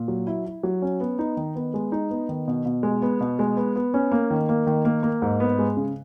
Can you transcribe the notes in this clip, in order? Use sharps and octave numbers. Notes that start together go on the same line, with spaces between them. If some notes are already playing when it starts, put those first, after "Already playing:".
Already playing: A#2
F#3
E4
E4
F#3
C#4
B3
D#4
D#3
B3
G#3
D#4
B3
D#3
B2
B2
G#3
B3
B2
G#3
B3
B3
C#4
A#3
D#3
A#3
D#3
A#3
A#3
G#2
B3
G#3
C#3